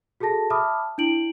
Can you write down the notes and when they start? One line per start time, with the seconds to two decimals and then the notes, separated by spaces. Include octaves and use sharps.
0.20 F#4 G#4 A4 A5 A#6
0.50 E5 A5 B5 D6 D#6 F6
0.98 D4 E4 D7 F#7